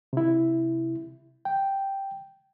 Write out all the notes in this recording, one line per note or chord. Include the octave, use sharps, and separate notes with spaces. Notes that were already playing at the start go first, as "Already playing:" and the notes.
C3 E4
G5